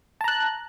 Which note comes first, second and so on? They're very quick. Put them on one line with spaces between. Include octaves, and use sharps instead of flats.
A5 A#5 F#6